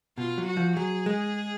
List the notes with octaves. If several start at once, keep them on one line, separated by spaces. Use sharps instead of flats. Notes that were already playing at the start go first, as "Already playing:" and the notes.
B2 F4
F#3
F#4
F3
F#3 G#4
G#3